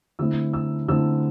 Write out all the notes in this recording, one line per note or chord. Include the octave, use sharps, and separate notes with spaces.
D3 A3 C4 E4 E6
E6
D3 A3 C4 E4 E6